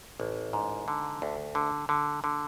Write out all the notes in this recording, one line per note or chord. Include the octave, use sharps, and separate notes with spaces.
A1
G#2
D3
D2
D3
D3
D3